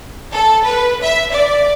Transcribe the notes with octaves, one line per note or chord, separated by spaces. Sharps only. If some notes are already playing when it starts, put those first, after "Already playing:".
A4
B4
E5
D5